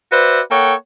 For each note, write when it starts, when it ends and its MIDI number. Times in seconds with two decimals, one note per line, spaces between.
0.11 0.40 66
0.11 0.40 71
0.11 0.40 72
0.11 0.40 74
0.11 0.40 76
0.51 0.74 58
0.51 0.74 69
0.51 0.74 73
0.51 0.74 78
0.51 0.74 79